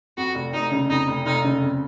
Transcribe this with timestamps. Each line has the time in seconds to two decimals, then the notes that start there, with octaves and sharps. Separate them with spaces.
0.17 F2 F#4
0.35 F1
0.53 F1 D#4
0.72 C#3
0.89 F2 D#4
1.08 F1
1.26 F1 D#4
1.44 C#3
1.61 F2